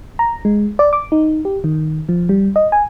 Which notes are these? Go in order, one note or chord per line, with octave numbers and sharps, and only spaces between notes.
A#5
G#3
D5
D6
D#4
G4
D#3
F3
G3
D#5
G#5